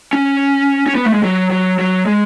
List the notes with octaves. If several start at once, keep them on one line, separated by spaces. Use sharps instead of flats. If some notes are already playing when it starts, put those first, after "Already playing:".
C#4
C#4
B3
A3
G#3
F#3
F#3
F#3
G#3